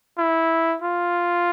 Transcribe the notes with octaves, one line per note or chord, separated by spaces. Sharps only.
E4
F4